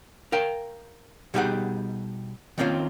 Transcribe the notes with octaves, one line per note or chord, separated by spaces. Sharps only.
A#4 F5 G5
B2 G3 D#4 G4 G#4 F#5
D#3 A#3 C4 C#4 F4